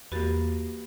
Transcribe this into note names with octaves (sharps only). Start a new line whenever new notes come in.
E2 A#3 F#4 G4 B4 A6